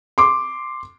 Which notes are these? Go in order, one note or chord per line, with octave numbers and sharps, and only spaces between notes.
C6 D6